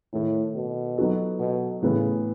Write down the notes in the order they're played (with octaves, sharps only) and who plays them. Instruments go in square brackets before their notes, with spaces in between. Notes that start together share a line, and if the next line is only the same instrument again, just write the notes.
[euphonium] A2 [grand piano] D#3 A3 D#4 A4
[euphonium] B2
[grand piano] F#3 B3 D#4 F#4 A4
[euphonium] B2
[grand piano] A2 E3 B3 [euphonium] C#3